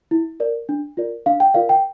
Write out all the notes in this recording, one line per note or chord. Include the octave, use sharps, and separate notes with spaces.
E4
A#4 D5
D4
F4 A#4 D5
D4 F5
G5
F4 A#4 D5 F5
G5